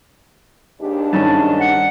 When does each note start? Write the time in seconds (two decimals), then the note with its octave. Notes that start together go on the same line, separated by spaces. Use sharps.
0.81 D#2 G#2 D4 G4
1.13 G2 D#3 C#4 A5
1.61 F#5